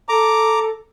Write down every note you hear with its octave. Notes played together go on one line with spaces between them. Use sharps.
A4 A#5 D6